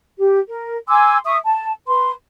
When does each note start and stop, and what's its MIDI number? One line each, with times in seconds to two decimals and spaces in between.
0.19 0.40 67
0.50 0.77 70
0.88 1.18 80
0.88 1.18 84
0.88 1.18 86
0.88 1.18 88
1.25 1.37 76
1.25 1.37 85
1.25 1.37 87
1.45 1.73 81
1.88 2.13 71
1.88 2.13 84